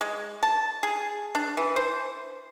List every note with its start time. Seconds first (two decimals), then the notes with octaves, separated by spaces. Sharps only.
0.01 G#3
0.43 A5
0.83 G#4
1.35 D4
1.57 E3
1.76 C5